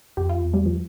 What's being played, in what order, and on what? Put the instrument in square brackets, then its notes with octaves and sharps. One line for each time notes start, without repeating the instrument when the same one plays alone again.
[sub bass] F2 [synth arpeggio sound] G4
[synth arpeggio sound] F4
[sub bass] E2
[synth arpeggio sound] G3
F3